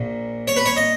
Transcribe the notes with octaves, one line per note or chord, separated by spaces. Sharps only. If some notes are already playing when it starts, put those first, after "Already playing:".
Already playing: A#1 A#2
C#5
B4
C#5
D#5